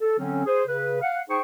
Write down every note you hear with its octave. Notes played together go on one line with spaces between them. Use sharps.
A4
D3 F#3 C4 C#4
G#4 C5
C#3 B4
F5 F#5
D#4 G#4 C5 G5 C#6